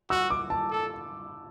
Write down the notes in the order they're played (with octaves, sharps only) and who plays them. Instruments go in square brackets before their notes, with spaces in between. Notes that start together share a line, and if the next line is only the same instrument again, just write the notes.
[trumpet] F#4 [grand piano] E6
[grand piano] D6
A5
[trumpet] A4